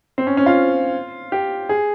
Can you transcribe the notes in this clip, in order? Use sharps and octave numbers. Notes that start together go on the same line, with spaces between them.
C4
C#4
C#4
F4
G4
G#4